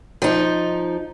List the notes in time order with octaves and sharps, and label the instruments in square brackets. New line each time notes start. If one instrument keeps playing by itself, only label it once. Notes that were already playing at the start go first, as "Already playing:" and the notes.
[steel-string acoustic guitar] F3 D#4